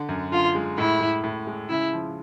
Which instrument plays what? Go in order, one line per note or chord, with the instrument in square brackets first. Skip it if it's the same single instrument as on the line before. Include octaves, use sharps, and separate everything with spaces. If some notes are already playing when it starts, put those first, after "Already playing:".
Already playing: [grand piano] D3
F#2
[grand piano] D3 [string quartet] F4
[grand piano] G#3
[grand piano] A2 [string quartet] E4
[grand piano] A2
A2
G#3
[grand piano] C#3 [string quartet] E4
[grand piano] F3